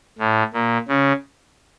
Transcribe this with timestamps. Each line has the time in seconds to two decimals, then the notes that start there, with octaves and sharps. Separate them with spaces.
0.19 A2
0.54 A#2
0.88 C#3